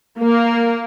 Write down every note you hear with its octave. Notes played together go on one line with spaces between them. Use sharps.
A#3